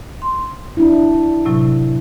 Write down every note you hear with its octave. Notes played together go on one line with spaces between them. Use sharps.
C6
D4 E4
A2 C3 F#3